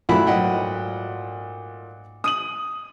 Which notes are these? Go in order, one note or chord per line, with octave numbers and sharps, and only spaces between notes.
A#1 F#2 A#2 A3 E4 F#4 B5
G#2 F#3 D#5 F#5 G5
D#6 D#7 F#7